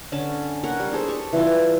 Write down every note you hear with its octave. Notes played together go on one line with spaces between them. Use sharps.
D3 C#4 A5
A#4 C#5 F#5
G3
D4 G#4 A4 C5
G4 C#6
E3 G3 E4 F4